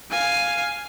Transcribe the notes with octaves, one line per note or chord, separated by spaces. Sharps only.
F5 G#5